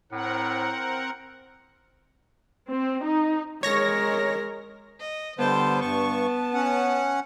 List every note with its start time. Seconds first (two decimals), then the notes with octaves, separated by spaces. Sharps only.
0.12 A2 C4 A#4 F#5
2.68 C4
3.05 D#4
3.63 G#3 A#4 C#5 A#6
5.00 D#5
5.39 D3 G3 B3 C5 G5 A5
5.81 G2 A5 C#6
6.54 C#4 F#5